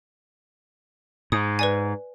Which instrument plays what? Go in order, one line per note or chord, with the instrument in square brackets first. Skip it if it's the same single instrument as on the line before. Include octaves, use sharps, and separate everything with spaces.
[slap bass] G#2 [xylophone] D#6
[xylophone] B4 D5 G#5